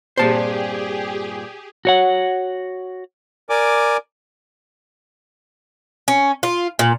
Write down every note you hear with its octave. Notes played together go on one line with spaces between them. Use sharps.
G2 A#2 C4 G4 G#4 C5 A5
F#4 C#5 F#5
A#4 D5 G#5 D6
C#4
F4
A#2